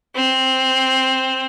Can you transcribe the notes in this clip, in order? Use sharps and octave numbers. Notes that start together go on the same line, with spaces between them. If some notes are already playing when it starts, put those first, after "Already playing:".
C4